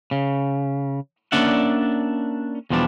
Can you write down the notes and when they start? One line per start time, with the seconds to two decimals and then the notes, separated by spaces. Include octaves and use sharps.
0.11 C#3
1.32 A#3 C#4 D4 D5 E5 F#5
2.70 E2 B2 F3 G3 D4